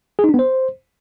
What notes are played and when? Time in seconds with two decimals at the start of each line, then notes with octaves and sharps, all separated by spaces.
0.19 G#4
0.24 D#4
0.29 D4
0.34 B3
0.39 C5